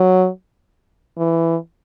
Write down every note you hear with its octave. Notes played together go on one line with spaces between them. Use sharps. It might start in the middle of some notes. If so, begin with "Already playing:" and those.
Already playing: F#3
E3